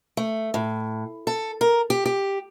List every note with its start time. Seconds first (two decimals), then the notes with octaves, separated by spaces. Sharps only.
0.17 A3
0.54 A2
1.27 A4
1.61 A#4
1.90 G4
2.06 G4